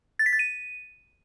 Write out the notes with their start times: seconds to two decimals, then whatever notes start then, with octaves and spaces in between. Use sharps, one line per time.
0.19 A6
0.26 B6
0.33 A6
0.39 D#7